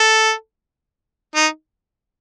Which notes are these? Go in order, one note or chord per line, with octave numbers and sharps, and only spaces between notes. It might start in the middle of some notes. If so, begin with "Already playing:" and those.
Already playing: A4
D#4